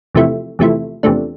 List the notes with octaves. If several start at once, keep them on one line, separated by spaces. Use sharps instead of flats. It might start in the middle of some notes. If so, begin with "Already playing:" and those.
E2 C3 F3 A3 E4
E2 C3 F3 A3 E4
E2 C3 F3 A3 D4